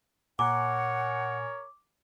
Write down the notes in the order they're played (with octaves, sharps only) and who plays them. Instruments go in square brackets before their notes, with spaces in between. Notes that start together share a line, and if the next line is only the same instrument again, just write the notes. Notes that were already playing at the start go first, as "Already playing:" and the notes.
[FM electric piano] A#2 G#5 A#5 [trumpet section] A#4 C#5 [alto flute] F#5 [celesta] D6